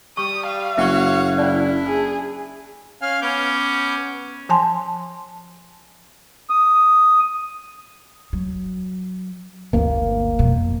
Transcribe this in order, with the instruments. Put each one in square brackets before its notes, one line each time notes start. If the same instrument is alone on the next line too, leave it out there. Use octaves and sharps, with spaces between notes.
[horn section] G3 [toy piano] C#6 [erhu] D#6
[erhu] F5
[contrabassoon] F#1 [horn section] F#4 C#5 [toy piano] E5 F#5 C#6
[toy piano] C#4 D5 [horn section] D4 E4
[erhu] G#4
[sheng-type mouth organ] C#4 G#5 F6 [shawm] F5
[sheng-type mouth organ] B3 D6 G6 [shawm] C#4
[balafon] F3 G#5 A5 C6
[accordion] D#6
[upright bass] F#3
[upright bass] G1 D2 [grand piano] A#3
[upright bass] F2 B2